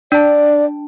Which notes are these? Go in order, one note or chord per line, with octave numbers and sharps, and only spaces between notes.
D4 D5 A5